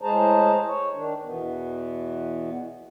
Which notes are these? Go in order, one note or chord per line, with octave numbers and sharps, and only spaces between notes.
A2 G#3 G#4 C5 A5 A#5
C#5
D#3 D4
E2 B2 E3 B3